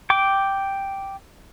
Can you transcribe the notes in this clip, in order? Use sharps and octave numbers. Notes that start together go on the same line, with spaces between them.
G5 D6